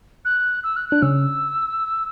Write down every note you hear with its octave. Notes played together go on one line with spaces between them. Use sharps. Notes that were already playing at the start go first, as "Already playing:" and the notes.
F#6
E6
F#6
D4 F#6
C#3 C#4 E6